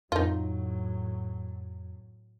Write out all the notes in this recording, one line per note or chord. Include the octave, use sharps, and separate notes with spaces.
F2 A2 F#3 D#4 F4